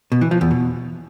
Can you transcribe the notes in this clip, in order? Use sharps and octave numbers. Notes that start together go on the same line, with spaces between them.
B2
E3
F3
E2
B2